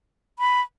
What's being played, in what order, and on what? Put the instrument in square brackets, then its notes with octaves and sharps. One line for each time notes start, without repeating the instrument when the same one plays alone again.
[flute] B5